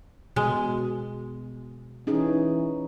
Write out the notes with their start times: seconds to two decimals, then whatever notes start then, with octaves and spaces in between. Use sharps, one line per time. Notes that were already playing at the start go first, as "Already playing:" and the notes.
0.36 B2 G#3
2.07 E3 C#4 D#4 G#4